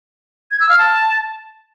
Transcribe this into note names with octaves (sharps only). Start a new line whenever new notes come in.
G#6
E6
F5
A5